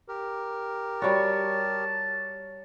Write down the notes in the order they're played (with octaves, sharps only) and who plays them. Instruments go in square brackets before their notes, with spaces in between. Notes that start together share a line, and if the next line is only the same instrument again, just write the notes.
[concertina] G4 A#4
[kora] G3 F#4 [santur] C#5 C#6 [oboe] A5